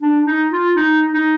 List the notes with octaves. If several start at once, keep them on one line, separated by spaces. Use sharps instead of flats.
D4
D#4
F4
D#4
D#4